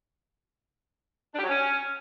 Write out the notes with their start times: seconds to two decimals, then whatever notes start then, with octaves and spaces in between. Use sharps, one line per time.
1.33 D4
1.39 G4
1.44 F#3
1.49 C#4